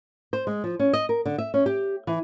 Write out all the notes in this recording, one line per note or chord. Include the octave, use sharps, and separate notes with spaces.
C5
G#3
F3
C#4
D#5
A#4
D3
E5
C#4
G4
E3